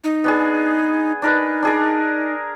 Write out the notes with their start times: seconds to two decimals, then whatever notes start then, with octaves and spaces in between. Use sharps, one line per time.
0.04 D#4
0.24 B3 D4 G#4
1.22 D4 D#4 A#4 B4
1.63 D4 G#4 A#4